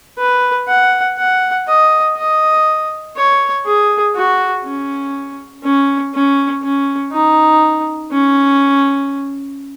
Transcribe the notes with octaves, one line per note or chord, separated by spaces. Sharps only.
B4
F#5
F#5
D#5
D#5
C#5
G#4
F#4
C#4
C#4
C#4
C#4
D#4
C#4